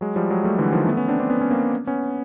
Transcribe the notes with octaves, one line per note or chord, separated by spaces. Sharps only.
F#3 G#3
F3 G3
F#3 G#3
G3 A3
D3 E3
D#3 F3
A3 B3
B3 C#4
C4 D4
C4 D4
B3 C#4
C#4
A#3 C4
B3 C#4